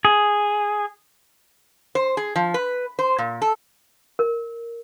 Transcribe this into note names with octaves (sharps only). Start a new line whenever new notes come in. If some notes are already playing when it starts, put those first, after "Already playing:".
G#4
C5
G#4
F3
B4
C5
A#2
A4
A#4